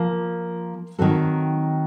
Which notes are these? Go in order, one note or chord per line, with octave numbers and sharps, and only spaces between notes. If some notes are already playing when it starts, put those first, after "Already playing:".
Already playing: F3 A#3 F4 A#4
D#3 F#3 C4 F#4 A4